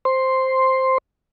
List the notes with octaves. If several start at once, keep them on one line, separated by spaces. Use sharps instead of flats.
C5 C6